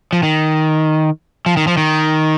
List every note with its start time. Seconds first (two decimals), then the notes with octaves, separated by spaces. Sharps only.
0.13 F3
0.23 D#3
1.46 F3
1.57 D#3
1.67 F3
1.77 D#3